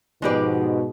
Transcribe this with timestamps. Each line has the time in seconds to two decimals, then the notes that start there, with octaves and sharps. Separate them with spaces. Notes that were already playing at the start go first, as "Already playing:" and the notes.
0.22 G#2 B2 F3 G#3 G4 G#4 B4 D5